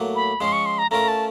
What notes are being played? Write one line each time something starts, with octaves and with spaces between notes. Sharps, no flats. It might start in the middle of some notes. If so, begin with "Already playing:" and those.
Already playing: A2 F#3 A#3
B5
F3 G#3 C#4 C6
C#6
C6
A#5
A3 C#4 F4 A#4 A#5
A5